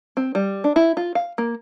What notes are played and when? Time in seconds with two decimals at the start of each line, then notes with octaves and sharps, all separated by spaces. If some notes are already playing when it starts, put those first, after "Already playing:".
0.17 C4
0.35 G3
0.64 D4
0.76 E4
0.97 F4
1.15 F5
1.38 A#3